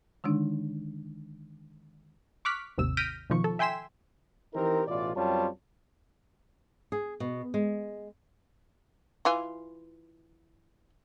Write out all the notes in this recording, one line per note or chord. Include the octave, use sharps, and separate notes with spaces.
D3 D#3 G#3 D4 D#4
C#6 D6 F6 F#6 B6
G#1 D#2 C3 E6
F6 G6 A#6 B6 D7 D#7
B2 D#3 F3 C#6
A4
E5 G5 G#5 C6 B6 E7
E3 C4 D#4 G4 A#4
A1 B2 E3 F4 D5
F#2 G3 C4 F4 C#5 A5
G#4
B2
G#3
E3 F4 G#5